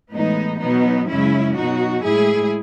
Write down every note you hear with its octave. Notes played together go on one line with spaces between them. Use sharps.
A2 E3 G#3 B3 D#4
B2 F#3 B3 D#4
F#2 C#3 G#3 C#4 E4
B2 F#3 D#4 F#4
A2 G#3 E4 G#4